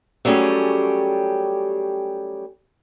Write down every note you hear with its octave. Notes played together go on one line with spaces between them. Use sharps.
F#3 G3 A3 C#4 G4 G#4